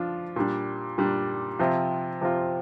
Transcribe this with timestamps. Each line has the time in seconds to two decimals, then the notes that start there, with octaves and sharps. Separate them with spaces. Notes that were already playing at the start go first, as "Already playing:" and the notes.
Already playing: F3 D4 F4
0.36 A#2 G3 D4
0.98 A#2 G3 D4
1.59 C3 F3 C4 F4
2.21 C3 F3 C4 F4